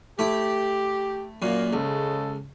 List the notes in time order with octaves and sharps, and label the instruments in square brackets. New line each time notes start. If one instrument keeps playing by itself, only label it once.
[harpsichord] A3 E4 [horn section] G4
[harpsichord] F#2 A#2 [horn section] A#3
[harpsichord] C#2 [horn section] C#3 G#3 A4